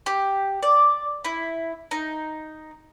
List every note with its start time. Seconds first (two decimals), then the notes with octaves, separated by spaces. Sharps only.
0.06 G4
0.63 D5
1.25 E4
1.91 D#4